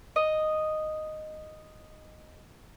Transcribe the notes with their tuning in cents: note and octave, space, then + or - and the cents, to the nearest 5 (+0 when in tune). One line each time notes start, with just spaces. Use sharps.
D#5 -5